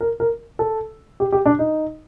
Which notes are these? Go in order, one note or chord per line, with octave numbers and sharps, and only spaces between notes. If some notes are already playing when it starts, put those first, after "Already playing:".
A#4
A#4
A4
G4
G4
D4
D#4